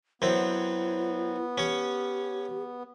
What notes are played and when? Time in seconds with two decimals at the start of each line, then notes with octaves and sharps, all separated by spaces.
0.22 F#2 B3 C4 E4
1.58 C#4 G4 C#5